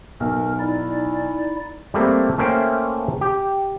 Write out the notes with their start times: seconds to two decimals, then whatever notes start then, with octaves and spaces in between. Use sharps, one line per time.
0.20 B1 A#4
0.60 D#4 E4 D5
1.94 G3 A3 A#3 C4
2.38 A3 A#3 C#4 C5 E5 G5
3.21 G4